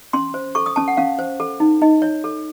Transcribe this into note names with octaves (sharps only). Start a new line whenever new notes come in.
C#4 C6
C5
A4 C#6
D#6
C#4 A5
F#5
C#4 F5
C5
A4
D#4
D#4 D#5
C#5
A4